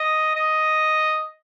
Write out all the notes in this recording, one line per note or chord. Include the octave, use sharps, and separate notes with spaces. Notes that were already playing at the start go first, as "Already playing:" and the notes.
Already playing: D#5
D#5